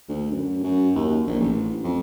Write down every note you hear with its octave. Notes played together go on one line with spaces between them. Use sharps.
D2
F#2
F#2
D#2
A#1
A1
F2